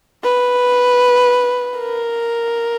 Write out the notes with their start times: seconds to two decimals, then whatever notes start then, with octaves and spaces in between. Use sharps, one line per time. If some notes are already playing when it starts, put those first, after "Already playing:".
0.23 B4
1.79 A#4